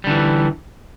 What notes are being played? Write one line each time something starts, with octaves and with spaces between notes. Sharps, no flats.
D3 E3 G3